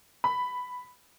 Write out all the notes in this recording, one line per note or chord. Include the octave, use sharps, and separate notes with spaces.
B5